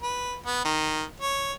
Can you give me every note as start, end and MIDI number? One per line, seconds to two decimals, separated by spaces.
0.02 0.35 71
0.46 0.62 59
0.65 1.03 51
1.20 1.53 73